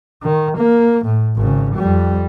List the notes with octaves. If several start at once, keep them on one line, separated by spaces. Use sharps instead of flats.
D#3
A#3
A2
G#1 C#3
F2 G3